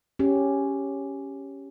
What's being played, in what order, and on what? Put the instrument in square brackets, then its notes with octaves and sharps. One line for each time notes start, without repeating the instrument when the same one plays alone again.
[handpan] C#4 G4